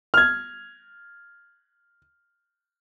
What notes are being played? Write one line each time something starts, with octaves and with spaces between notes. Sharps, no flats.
F6 G#6